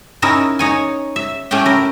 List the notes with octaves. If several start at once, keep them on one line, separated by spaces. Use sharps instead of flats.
C#4 D#4 E4 A#4 E5
D#4 C#5 G#5
E5
A2 A3 C#4 G4 G5
E4 A#4